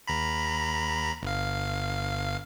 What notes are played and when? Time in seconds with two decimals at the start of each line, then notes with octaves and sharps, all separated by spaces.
0.08 D#2 A#5 B5
1.23 G1 F5